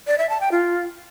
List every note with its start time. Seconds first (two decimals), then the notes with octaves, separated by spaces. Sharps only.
0.07 D5
0.18 E5
0.29 A5
0.41 G5
0.52 F4